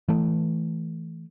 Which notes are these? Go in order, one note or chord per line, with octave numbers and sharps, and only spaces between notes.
E3 A3